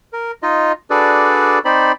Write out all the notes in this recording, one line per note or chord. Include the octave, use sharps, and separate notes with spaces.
A#4
D#4 F4 D#5
D4 F#4 G#4 A4 B4 D5
C4 D#4 C5 D5 B5